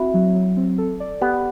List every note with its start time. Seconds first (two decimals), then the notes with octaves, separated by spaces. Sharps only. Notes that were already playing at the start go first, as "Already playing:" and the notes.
Already playing: C4 E4 F#4
0.14 F#3
0.35 F#3
0.57 C4
0.78 A4
1.00 D5
1.21 B3 G4